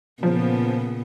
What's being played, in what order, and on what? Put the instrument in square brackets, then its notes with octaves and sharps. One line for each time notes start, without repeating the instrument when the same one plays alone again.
[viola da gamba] A#2 C#3 B3 [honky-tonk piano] F3